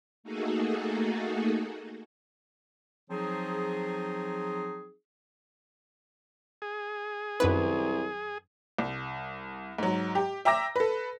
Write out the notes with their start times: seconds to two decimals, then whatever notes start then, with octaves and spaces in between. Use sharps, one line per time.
0.24 A3 A#3 D#4 F#4 G#4 A4
3.10 F3 F#3 C4 D#4 G#4
6.62 G#4
7.40 C2 F#2 D#3 B4
8.79 C2
9.78 G#2 F#3
10.15 G4
10.45 E5 G5 A#5 D6 E6 A#6
10.76 A4 B4